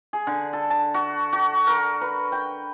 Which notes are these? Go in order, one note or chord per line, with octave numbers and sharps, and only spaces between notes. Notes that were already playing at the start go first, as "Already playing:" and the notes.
G#4
D3
A4
A5
F#4
F#4
A#4
B4
G5